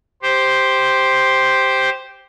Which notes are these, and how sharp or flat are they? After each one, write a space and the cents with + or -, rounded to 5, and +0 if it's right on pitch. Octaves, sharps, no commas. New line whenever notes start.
G4 +0 C5 +0